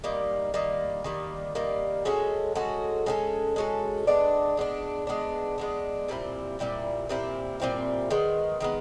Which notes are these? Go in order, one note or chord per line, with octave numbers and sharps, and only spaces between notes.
D#3 G3 A#3
D#3 G3 A#3
D#3 G3 A#3
D#3 G3 A#3
G#3 C#4 F#4 A4
G#3 C#4 F#4 A4
G#3 C#4 F#4 A4
G#3 C#4 F#4 A4
G#3 B3 D4
G#3 B3 D4
G#3 B3 D4
G#3 B3 D4
A#2 G3 C4 E4
A#2 G3 C4 E4
A#2 G3 C4 E4
A#2 G3 C4 E4
D#3 G#3 B3
D#3 G#3 B3